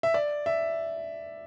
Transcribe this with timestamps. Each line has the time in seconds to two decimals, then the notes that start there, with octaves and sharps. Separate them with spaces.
0.03 E5
0.14 D5
0.46 E5